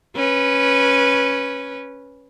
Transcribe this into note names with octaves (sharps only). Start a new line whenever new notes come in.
C#4 B4